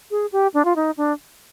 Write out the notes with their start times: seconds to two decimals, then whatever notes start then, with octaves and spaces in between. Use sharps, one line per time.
0.11 G#4
0.32 G4
0.54 D4
0.65 F4
0.76 D#4
0.97 D4